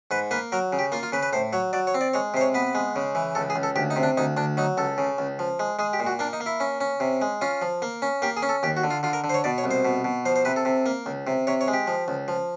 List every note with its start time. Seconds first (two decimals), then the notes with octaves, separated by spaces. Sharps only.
0.11 G#2 B4
0.31 A#3 B4
0.52 F#3 A#4
0.73 C#3
0.79 G4
0.92 A#3 F4
1.03 F4
1.13 C#3 B4
1.23 B4
1.33 A2 C5
1.53 F#3 C#5
1.73 F#3 D5
1.87 C#5
1.94 C4
2.01 D5
2.14 G#3 C#5
2.34 C3 C5
2.41 C#5
2.54 B3 B4
2.75 G#3
2.96 C#3
3.15 E3
3.35 C#2 A4
3.50 G#4
3.56 C#2
3.63 A4
3.76 D2 G4
3.91 D#4
3.96 C3
4.03 D4
4.17 D2 D#4
4.37 D2 D4
4.57 F#3 D#4
4.77 C#2 A4
4.98 C#3
5.18 C#2
5.39 F3
5.60 G#3
5.79 G#3 G#4
5.93 G4
6.00 A#2
6.07 F#4
6.19 A#3 D4
6.33 D#4
6.41 A#3
6.46 E4
6.60 C#4
6.81 C#4
7.00 C3
7.22 G#3
7.41 C#4 F4
7.62 F3
7.82 A#3
8.02 C#4
8.22 A#3 G4
8.37 G#4
8.43 C#4
8.49 A4
8.63 D#2 G4
8.77 F#4
8.84 D3
8.90 F4
9.03 D3 F4
9.13 A#4
9.24 D3
9.29 C5
9.34 C#5
9.44 B2 D5
9.58 C#5
9.64 C2
9.71 C5
9.85 B2
10.04 B2
10.26 F3 C5
10.36 C5
10.45 C3 B4
10.56 A4
10.65 C3
10.86 A#3
11.06 C#2
11.27 C3
11.47 C3 C#5
11.61 C#5
11.68 G#3
11.73 G4
11.87 F3
12.08 C#2
12.28 F3